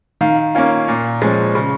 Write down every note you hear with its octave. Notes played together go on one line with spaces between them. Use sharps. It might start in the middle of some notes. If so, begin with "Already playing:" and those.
D#3 F5
A#3 C#4 F4
A#2
F3 G#3 C#4
C#3